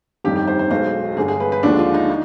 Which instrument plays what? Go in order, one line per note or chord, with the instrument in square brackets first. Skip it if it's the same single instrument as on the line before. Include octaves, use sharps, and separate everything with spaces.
[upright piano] G1 F2 D#3 G3 G4
G4
C5
C5
B1 B2 G#3 C5
G1 G2 D3 G#4
G#4
B4
B4
D#2 D3 F3 G#3 D4
F4
D#4
D#4